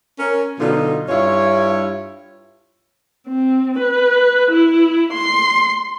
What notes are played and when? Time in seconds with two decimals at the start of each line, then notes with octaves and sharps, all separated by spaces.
0.19 C#4 A#4
0.58 B2 D3 F#3 D#4 F4
1.09 G2 E4 F4 C#5
3.28 C4
3.79 B4
4.51 E4
5.13 C6